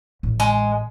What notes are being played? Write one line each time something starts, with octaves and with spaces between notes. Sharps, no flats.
A1
G#3